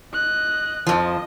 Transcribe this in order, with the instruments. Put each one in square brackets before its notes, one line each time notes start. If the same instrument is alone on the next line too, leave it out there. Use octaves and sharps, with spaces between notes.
[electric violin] D#5 F#6
[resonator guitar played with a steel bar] F2 F3 [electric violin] D#5